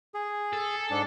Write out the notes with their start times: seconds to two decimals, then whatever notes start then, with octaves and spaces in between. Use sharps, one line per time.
0.14 G#4
0.53 A4
0.91 G#2 D4